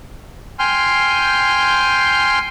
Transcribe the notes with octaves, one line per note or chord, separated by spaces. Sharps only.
G5 G#5 C6 F6 G6